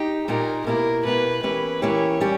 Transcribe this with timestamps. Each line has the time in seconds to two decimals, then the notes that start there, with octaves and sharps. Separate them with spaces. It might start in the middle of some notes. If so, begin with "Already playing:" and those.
Already playing: D#4 G4
0.28 A#2 A#3 D#4 G4 A#4
0.66 B2 A#3 E4 G4 A#4
1.05 B2 A#3 E4 G4 B4
1.43 E3 A#3 C#4 E4 G4 B4
1.81 E3 A#3 C#4 E4 G4 C#5
2.20 G3 C#4 G4